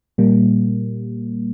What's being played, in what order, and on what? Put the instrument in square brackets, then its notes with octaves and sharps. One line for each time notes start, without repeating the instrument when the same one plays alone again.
[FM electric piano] A#2 G3 A#3